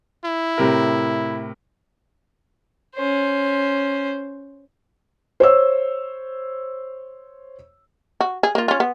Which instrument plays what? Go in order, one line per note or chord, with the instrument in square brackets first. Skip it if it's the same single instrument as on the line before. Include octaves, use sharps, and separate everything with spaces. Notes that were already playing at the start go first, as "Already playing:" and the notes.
[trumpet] E4
[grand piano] A2 C3 A#4
[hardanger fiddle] C#4 C5
[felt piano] C5 C#5 E6
[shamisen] F#4
G#4
A#3 F4
C#4 F4
B3